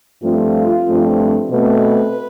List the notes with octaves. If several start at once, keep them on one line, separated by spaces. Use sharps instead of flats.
G2 F3 A3 C4 F4
G2 F3 A3 C4
B2 A3 C4 B4